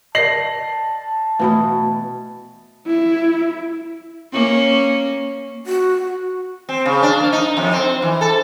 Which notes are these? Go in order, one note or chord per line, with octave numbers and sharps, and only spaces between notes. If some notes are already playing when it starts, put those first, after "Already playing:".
A#4 D5 D#5 A5 A#6 C7 F#7
B2 E3 A3 B5
E4
A#3 C#4
F#4
C4
C#3
D4
A#3
D#4
F2
C4
E3
A4